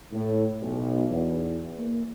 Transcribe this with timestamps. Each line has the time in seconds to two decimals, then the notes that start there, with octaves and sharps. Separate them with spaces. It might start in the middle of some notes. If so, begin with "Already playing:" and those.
0.12 A2
0.61 B1
1.10 E2
1.78 A#3